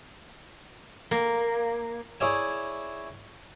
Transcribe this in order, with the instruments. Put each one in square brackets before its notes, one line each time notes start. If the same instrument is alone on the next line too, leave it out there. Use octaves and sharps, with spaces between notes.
[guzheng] A#3
[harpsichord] E4 G#4 C#5 D5 E5 G#5